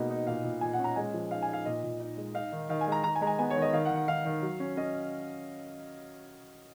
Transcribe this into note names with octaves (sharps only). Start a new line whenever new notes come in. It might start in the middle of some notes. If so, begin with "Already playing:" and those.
Already playing: B2 G#3 A#3 D#4
D#4
A#2 F5
A#2
A#2 G#5
F#5
C#4
A#5
G#3 G#5
F3
D#4 F5
G#5
D#4
F5
A#2 D#5
A#2
D#4
G#3
D#4 F5
D#3
D#3 F5
G#5
G#3 A#5
D#3 A#5
G#5
G#3 A#5
G#5
B3 G#5
C#5
D#3
D#5
D#3 F5
F#5
D#3
F#5
D#3 F5
D#3
F#3
C#4
C#4 D#5